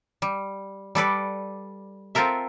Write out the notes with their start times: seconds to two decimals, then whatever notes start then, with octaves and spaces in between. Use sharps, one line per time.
0.22 G3
0.95 G3 A4 B4 D5
2.15 C4 F4 A4 A#4 E5